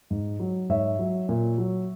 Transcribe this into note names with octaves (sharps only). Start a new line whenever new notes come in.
G#2
F#3
G#2 C#5 E5
F#3
A#2
F#3